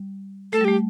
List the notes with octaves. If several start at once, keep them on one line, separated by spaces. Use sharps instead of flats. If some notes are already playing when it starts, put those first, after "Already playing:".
Already playing: G3
A3 A4
G3
A3 G4